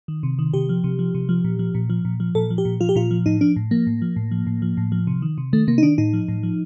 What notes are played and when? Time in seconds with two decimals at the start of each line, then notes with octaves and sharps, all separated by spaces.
0.08 D#3
0.23 C3
0.39 D#3
0.54 C3 G4
0.69 F3
0.84 C3
0.99 F3
1.14 C3
1.29 F3
1.44 A#2
1.59 F3
1.75 A#2
1.90 F3
2.05 A#2
2.20 F3
2.35 A#2 A4
2.50 F3
2.58 G4
2.65 A#2
2.80 F3 F4
2.89 G4
2.95 A#2 F4
3.11 F3
3.26 A2 D#4
3.41 F3 D4
3.56 A2
3.71 F3 A#3
3.87 A2
4.02 F3
4.16 A2
4.31 F3
4.47 A2
4.62 F3
4.77 A2
4.92 F3
5.07 C3
5.22 D#3
5.38 C3
5.53 D#3 A3
5.67 C3 A#3
5.78 D#4
5.83 D#3 D4
5.98 A2 D#4
6.13 F3
6.28 A2
6.43 F3